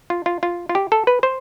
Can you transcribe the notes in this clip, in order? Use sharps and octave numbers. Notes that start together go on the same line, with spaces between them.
F4
F4
F4
F4
G4
A4
B4
C5